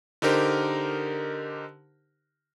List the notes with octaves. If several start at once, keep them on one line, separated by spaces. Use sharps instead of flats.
D3 D#4 G4 A#4 C5